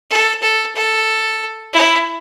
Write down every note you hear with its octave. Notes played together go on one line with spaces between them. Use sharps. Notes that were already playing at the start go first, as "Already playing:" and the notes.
A4
A4
A4
E4